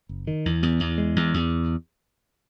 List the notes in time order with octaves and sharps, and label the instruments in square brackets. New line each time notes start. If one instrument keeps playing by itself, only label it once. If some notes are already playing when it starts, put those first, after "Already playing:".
[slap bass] F#1
D#3
E2
E2
E2
G#3
E2
E2